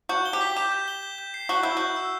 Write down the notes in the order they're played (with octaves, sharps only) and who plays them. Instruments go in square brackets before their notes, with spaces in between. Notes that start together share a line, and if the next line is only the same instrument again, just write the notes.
[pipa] F#4 [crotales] G6
[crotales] G7
[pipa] G4
[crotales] B6
[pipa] G4 [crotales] E7
[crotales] G6
G7
G6
G6
C7
[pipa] F#4 [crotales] G7
[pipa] E4 [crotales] G6
[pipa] F#4 [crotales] G6
[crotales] E6